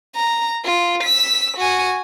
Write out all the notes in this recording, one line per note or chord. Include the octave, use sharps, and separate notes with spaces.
A#5
F4
E6 B6
F#4 G#5